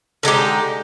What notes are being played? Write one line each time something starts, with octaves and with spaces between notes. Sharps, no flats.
D3 G#3 D#4 G4